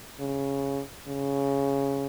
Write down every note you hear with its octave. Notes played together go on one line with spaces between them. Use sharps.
C#3
C#3